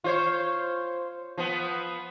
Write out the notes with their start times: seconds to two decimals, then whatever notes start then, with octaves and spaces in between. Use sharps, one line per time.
0.04 F4 C5 C#5
1.38 F3 B3